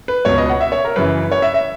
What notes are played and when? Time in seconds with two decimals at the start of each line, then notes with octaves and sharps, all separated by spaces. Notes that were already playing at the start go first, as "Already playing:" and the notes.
0.08 B4
0.25 C#2 B2 C#5
0.38 D#5
0.49 F#5
0.61 E5
0.72 C#5
0.84 A#4
0.96 F#2 C#3 E3 B4
1.32 C#5
1.42 E5
1.54 E5